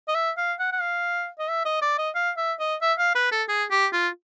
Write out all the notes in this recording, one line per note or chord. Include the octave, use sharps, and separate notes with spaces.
D#5
E5
F5
F#5
F#5
F5
D#5
E5
D#5
D5
D#5
F5
E5
D#5
E5
F5
B4
A4
G#4
G4
F4